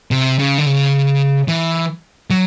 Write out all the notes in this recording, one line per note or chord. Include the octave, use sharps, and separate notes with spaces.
C3
C#3
D3
C#3
E3
F#3